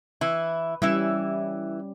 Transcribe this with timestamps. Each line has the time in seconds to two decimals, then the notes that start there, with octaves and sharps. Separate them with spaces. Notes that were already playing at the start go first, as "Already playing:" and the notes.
0.21 E3 E4
0.82 E3 G3 C#4 E4 E5